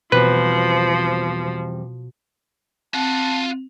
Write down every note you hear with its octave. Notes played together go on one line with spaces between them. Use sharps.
E2 B2 F3 G3 C4 B4
C4 F4 F#5 A5